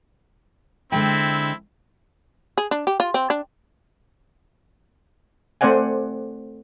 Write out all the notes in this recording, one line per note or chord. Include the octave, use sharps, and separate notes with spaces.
D3 G#3 C4 E4 G5
G#4
D4
G4
F4
C4
D4
A3 C4 C5 D5 F#5 G#5